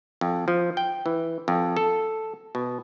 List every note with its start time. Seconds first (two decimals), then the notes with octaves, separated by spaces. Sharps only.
0.21 F2
0.48 F3
0.77 G5
1.06 E3
1.48 F2
1.77 A4
2.55 B2